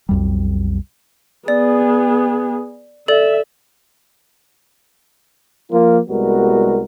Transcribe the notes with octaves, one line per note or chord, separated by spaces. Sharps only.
B1 F2 G3
B3 G#4 D5
A4 D5 E5
F3 A#3 F4
C2 G3 G#3 B3 F#4 A#4